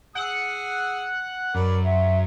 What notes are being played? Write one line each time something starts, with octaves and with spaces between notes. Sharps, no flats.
G#4 F#5 E6
F#2 A#4 B4 D5
F4 F#4 E5